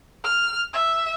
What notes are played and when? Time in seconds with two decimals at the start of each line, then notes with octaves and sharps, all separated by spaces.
0.24 F6
0.73 E5